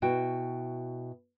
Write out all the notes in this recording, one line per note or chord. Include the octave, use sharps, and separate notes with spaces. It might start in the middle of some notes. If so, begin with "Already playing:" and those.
B2 E4 F#4 G5